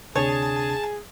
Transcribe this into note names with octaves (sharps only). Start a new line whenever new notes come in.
D2 C3 D4 G#4 C#5 A5